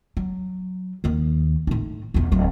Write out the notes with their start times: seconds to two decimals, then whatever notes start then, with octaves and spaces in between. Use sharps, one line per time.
0.17 F#3
1.04 D#2 D#3
1.67 A2 D#4
2.14 B1 E2
2.32 D1 F#3